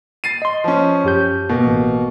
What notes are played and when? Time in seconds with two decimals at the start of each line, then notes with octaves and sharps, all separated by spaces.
0.24 A6 C7 D#7
0.42 D#5 C6
0.64 F3 C#4
1.04 F#2 G4 G6
1.49 B2 A#3
1.66 A1